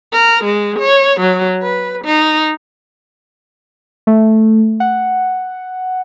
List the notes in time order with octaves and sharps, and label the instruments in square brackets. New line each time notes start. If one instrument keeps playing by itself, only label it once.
[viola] A#4
G#3
C#5
F#3
B4
D#4
[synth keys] A3
F#5